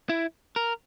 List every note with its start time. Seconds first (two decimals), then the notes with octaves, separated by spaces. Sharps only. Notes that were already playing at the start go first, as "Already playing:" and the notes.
0.09 E4
0.56 A#4